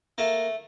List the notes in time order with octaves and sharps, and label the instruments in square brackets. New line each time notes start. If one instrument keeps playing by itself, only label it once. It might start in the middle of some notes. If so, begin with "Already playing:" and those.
[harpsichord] A3 A#3